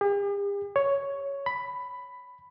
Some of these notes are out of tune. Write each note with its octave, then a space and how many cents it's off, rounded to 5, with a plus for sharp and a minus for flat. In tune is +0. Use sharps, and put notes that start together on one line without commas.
G4 +45
C#5 +5
B5 +10